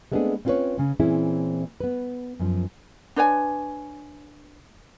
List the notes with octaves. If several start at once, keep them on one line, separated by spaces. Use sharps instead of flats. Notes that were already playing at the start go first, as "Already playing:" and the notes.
G#3 A3 B3 C4 D4 G#4
C4 C#4 F4 G#4 B4 C#5
C#3 C#4
A#2 E3 C4 C#4 E4 G#4
B3 B4
F#2 F3
D4 B4 C#5 G#5